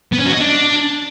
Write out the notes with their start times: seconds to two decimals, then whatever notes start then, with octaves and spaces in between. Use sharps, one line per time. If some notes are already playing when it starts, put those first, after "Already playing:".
0.13 B3
0.20 C#4
0.27 F#4
0.34 D#5
0.41 D4